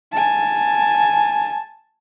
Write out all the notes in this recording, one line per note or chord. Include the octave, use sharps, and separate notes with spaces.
G#5 A5